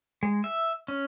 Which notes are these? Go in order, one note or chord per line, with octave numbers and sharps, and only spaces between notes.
G#3
E5
C#4